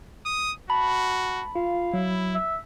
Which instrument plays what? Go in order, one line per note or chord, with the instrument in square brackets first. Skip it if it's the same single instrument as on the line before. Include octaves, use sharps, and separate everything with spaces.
[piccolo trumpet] D#6
[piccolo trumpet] F#4 [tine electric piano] A5 [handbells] B5
[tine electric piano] F4 [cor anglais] F5
[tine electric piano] F#3 [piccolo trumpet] E4
[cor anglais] E5